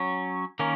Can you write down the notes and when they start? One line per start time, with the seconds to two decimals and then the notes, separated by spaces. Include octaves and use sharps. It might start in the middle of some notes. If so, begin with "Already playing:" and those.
Already playing: F#3 C#4
0.59 D#3 A#3 C#4